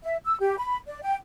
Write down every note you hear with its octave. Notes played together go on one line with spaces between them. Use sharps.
E5
E6
G4
B5
D5
G5